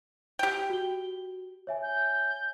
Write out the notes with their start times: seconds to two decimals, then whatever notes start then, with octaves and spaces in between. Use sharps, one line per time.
0.39 G4 G5
0.70 F#4 G7
1.67 C#5 E5 G#5
1.82 G6